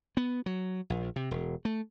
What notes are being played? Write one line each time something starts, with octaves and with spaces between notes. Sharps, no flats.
B3
F#3
A#1
C3
E1
A3